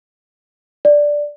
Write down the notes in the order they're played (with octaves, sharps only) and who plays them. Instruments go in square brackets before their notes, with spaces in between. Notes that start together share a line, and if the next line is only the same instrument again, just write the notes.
[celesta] D5